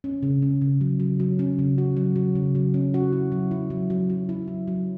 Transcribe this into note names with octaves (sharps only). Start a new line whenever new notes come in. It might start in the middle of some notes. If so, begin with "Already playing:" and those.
C#4
C#3
C#4
C#3
F#3
F#3
F#3
C#4
C#3
F#4
F#3
F#3
C#3
F#3
C#4
F#4
E4
F#3
E4
F#3
F#3
F#3
E4
F#3
F#3